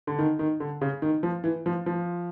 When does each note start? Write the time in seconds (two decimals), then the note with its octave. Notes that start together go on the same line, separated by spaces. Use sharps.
0.07 D3
0.19 D#3
0.39 D#3
0.60 D3
0.81 C#3
1.02 D#3
1.23 F3
1.44 E3
1.66 F3
1.86 F3